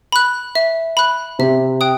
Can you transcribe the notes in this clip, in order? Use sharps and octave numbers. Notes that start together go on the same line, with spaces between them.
B5 F#6
E5
B5 F#6
C3 E5
G5 D#6 F#6